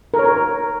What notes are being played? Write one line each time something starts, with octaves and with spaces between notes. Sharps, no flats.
A#4
C#5
A#4